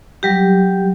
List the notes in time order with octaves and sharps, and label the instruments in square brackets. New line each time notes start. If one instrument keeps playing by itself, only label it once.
[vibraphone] F#3 G3 G4